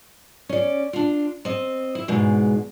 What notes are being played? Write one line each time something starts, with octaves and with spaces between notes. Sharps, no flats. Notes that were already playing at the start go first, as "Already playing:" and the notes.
C#4 D5
D4 F4
C4 D#5
E4
E2 G#2 B2 G#3